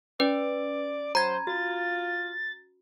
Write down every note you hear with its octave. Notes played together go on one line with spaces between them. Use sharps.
C#4 B4 D5
F#3 C5 A#5 B5 G#6
F4 F#4 A6